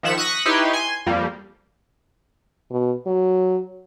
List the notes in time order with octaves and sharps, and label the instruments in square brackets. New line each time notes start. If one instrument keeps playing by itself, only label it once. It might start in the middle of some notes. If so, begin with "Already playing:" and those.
[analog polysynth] D#3 F3 E5 F#5 E7
C#6 D#6 F#6 A#6 B6
D#4 E4 G4 B4 C#5 C6
G#5 C6
F2 G3 A#3
[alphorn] B2
F#3